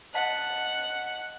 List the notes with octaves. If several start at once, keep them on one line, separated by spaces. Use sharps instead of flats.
D#5 F#5 A5 B6